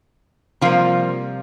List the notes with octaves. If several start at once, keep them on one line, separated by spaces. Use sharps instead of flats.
C3 F3 G3 A#3 F4